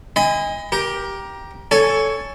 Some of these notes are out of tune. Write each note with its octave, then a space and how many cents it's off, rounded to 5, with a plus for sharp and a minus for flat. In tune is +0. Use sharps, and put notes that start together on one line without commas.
D#5 +20 G#5 -30 B5 +35
G4 +0 A#4 +20
A4 +0 C#5 +15 G#5 +0